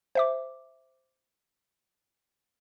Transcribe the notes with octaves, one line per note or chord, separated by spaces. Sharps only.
C5 E5 D6